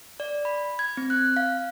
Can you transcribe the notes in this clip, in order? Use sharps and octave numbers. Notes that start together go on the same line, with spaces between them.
D5
B5
G#6
C4
F#6
F5